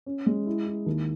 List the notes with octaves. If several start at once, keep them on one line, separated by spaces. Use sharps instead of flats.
C#4
G#3
E4
E4
D#2